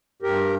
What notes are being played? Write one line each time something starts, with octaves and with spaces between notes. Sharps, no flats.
G2 G4 A#4